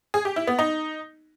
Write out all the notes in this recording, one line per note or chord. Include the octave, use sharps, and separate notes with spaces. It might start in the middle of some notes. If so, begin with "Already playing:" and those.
G#4
G4
E4
B3
D#4